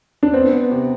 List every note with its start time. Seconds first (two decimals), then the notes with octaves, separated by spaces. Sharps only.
0.23 D4
0.33 B3 C4
0.52 B3
0.71 C3